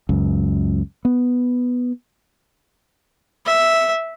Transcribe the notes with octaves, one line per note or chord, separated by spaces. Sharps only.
C#2 F#2
B3
E5